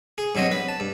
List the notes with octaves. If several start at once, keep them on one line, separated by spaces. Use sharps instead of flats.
G#4
G2 B2 F#3 C4 D#5
B4
A5
G2